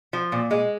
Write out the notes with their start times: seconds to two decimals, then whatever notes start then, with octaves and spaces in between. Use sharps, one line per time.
0.13 F3
0.32 A#2
0.51 G#3